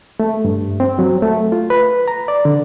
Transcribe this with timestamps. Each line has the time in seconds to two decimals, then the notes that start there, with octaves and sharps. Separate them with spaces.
0.20 A3
0.45 G2
0.80 C4
0.99 F#3
1.22 A3
1.52 F4
1.70 B4
2.08 A#5
2.28 D5
2.45 D3